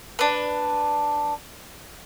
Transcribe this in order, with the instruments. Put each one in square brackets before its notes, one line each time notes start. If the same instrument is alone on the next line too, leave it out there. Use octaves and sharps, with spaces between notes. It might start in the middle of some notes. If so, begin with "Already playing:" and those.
[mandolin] D4 B4